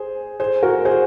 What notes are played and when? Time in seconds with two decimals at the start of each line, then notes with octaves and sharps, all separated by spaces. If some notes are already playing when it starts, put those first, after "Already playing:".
Already playing: G#4 C5
0.40 G#4 C5
0.63 F#4 A#4
0.85 G#4 C5